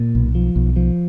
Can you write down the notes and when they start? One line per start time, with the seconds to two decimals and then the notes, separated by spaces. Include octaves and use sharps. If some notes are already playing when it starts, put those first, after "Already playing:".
Already playing: A#2
0.15 B1
0.35 F3
0.56 B1
0.76 F3